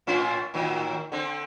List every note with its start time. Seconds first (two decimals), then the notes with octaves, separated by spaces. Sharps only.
0.07 A2 C#4 F4
0.54 A2 D#3 F#3
1.12 D3 C4